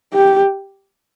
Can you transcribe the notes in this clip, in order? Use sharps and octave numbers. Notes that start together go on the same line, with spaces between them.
G4